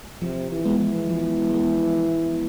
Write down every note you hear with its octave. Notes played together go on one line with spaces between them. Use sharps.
C3 F3
E3
G#3 B3
E3
F3
G#3
B3